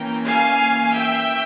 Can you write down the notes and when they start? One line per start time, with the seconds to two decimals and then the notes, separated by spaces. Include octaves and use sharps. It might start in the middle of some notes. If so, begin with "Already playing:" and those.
Already playing: E3 A#3 C#4 G5 A#5
0.28 F5 G#5
0.95 E5 G5